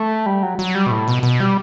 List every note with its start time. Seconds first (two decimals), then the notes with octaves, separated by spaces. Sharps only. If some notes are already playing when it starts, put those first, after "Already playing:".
Already playing: A3
0.26 G3
0.43 F#3
0.59 F#3
0.75 G3
0.87 B2
0.91 A2
1.08 B2
1.23 B2
1.40 G3